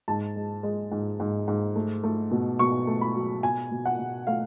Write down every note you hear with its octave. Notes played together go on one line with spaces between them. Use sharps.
G#2 A5
G#3
G#3
G#2
G#2
G#2
A3
A3
B2
B2 C#6
A3
B5
F#3
B2 G#5
B2
F#5
B2
A3 F5